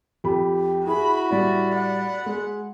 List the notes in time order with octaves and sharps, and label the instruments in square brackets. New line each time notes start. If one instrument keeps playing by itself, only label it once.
[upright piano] F2 B5 [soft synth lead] G4
[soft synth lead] E4 [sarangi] F#4 [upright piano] G#4 [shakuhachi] B5
[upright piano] A2 G3 E4 [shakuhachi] D5 [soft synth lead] B5
[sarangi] F#5
[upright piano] G#3